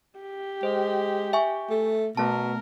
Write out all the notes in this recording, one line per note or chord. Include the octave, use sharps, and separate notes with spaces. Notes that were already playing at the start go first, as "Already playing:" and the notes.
G4
G#3 C5
E5 G#5 C#6
A3
B2 A3 B3 A#4 A5